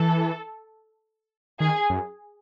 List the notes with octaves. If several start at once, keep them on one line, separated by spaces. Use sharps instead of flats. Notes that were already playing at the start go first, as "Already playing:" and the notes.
Already playing: E3 A4
D#3 G#4
F#2